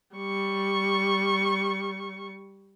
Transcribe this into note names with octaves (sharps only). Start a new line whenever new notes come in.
G3 C#6